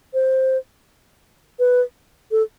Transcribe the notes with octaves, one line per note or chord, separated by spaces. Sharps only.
C5
B4
A4